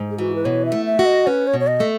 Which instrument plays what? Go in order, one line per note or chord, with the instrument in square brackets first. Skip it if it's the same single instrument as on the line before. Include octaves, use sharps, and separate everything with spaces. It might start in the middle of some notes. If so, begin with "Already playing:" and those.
Already playing: [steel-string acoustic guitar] G#2
[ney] G#4
[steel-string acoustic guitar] E3 [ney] F#4
[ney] B4
[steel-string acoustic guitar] B2 [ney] C#5
[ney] E5
[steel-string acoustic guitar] A3
[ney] E5
[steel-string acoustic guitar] F#4
[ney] D#5
[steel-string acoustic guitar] C#4 [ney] B4
[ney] C#5
[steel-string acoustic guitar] B2
[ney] C#5
D#5
[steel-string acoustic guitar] A3